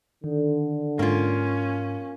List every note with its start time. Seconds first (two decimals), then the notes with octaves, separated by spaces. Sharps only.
0.24 D3 D#3
0.99 G#2 A#3 C#4 F4